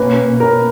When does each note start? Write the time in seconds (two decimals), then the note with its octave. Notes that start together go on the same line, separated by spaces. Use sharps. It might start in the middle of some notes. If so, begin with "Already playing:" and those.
Already playing: B2 A#3 C#4 B4
0.40 A#4